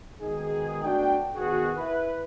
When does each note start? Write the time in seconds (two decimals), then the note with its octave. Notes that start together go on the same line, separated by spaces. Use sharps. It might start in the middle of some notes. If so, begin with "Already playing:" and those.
0.20 B2 D#3 G#3 D#4 G#4
0.83 B1 A3 D4 F#4 G5
1.35 B2 D#3 F#4 G#4
1.76 E4 B4